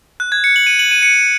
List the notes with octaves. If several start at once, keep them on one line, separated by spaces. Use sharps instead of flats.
F#6
G#6
C#7
F#7
D#7
F#7
D#7
C#7